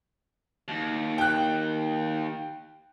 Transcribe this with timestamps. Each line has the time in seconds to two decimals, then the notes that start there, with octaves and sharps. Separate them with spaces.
0.68 D#2
1.18 G5 F#6